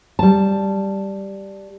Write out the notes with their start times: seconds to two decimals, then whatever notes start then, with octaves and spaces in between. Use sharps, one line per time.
0.19 G3 A5